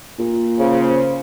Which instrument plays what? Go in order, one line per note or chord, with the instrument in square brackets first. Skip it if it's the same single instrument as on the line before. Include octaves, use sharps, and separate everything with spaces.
[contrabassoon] A#2
[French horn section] C#3 C5